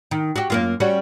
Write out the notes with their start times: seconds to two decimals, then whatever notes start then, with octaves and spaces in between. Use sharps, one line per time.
0.11 D#3
0.36 F#4 G4
0.50 F#2 A#3 F4
0.80 G3 C#4 F#4